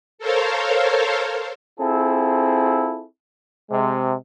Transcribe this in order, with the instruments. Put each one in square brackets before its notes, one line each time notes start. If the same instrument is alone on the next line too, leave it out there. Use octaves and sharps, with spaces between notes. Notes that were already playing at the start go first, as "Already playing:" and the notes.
[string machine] A4 A#4 C5 C#5 F5
[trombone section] C4 E4 F4 G#4 A4
C3 G#3